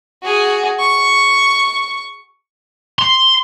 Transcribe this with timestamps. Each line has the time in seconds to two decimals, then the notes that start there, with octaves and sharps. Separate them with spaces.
0.22 F#4 G#4
0.79 C#6
2.99 C6